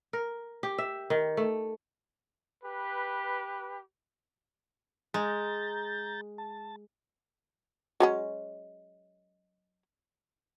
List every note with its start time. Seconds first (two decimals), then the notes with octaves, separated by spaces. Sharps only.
0.13 A#4
0.63 G4
0.78 E5
1.10 D#3
1.37 A3
2.63 G4 B4
5.14 G#3 A#5 G6 A6
6.38 A5
8.00 F#3 G#3 C#4